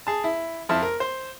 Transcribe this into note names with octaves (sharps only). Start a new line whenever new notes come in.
G#4 A5
E4
F2 E4 A5 F6
A#4
C5